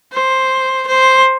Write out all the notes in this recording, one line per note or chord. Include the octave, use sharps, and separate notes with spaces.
C5
C5